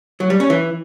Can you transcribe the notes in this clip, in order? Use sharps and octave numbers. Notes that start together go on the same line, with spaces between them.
F#3
G3
C#4
E3